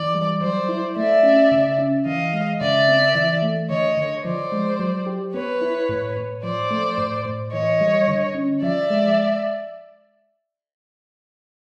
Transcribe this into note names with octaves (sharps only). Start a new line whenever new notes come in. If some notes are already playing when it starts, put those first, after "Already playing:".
Already playing: E3 D5
G3
F#3 C5 D5
E4
A3 D5 E5
C#4
C#3
C#4
E3 D#5 F5
G#3
C#3 D5 E5
C4
E3
A3
D3 C#5 D#5
D3
F3 C5 D5
G#3
F#3
G4
B3 B4 C#5
E4
A2
A2
F3 C5 D5
A3
A2
A2
E3 C#5 D#5
G3
D3
C#4
F3 D5 E5
G#3